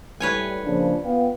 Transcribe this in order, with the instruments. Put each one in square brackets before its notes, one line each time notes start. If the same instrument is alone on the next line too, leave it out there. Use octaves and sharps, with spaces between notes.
[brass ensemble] A2 G3 [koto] B4 C#5 G#5
[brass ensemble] A#2 C#3 F3 [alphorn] D4
[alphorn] B3 [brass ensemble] F4 F5 G5